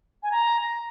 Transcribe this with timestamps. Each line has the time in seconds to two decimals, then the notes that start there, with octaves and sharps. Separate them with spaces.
0.23 G#5
0.31 A#5